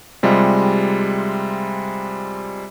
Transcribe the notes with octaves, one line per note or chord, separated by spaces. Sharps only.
C3 G3 G#3 F4